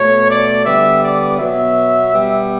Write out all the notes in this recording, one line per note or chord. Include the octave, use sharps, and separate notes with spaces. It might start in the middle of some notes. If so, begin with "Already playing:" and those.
Already playing: B2 A3 C#5
D5
D3 G3 B3 E5
D5
B2 F#3 B3 E5
B2 G3 B3